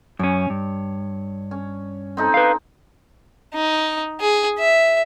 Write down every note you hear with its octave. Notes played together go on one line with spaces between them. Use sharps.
F#2 C#4 C#5
G2
C#4
C4 D#4 A4
B4 F5
D#4
G#4
E5